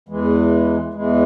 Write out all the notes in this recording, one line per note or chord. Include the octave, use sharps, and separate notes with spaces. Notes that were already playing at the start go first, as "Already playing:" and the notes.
E2 E3 G#3
E2 E3 G#3